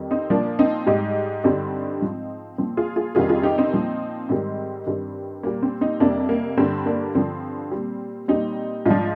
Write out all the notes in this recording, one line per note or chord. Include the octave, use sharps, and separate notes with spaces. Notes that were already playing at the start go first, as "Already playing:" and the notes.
Already playing: F2 D#3 G3
C4 D#4
A#2 F3 A#3 D4
C4 D#4
G#2 G3 D#4 G4
G2 D3 G3 C4 D#4
G#2 F3
A#2 F3 C4
F4 G#4
F4 G#4
F2 C3 D#3 G3 F4 G#4
F4 G#4
D#4 G4
C4 D#4
A#2 F3
G#2 D#3 G3 C4
G2 D#3 G3
A#2 G3 A#3
C4
C4 D#4
F2 C3 G3 A#3 D4
A#3
G2 D3 G3 C4
A#3 D4
G2 D3 F3 C4
A#2 G3
A#2 G3 C4 D#4
G#2 F3 D4 F4